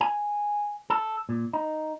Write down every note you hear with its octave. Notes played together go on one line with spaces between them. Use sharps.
G#5
A4
A#2
D#4